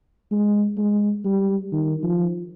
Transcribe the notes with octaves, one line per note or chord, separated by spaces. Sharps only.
G#3
G#3
G3
D#3
F3